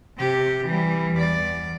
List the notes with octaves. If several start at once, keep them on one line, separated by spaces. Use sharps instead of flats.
C3 G4
E3 G3
E2 D5